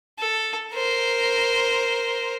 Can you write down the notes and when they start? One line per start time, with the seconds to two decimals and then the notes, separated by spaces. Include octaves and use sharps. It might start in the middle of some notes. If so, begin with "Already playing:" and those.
0.18 A4
0.73 A#4 C5